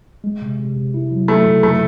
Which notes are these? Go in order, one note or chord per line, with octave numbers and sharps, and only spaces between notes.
G#3
C3
C3
C3
E4
F#3
F#3 A3
C#3
A3